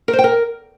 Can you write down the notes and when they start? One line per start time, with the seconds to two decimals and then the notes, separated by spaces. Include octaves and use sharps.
0.08 A#4
0.13 C5
0.19 G5
0.24 A#4